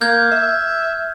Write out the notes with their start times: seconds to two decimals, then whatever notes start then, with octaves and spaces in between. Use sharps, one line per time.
0.01 A#3 F6 G6 G#6
0.31 E5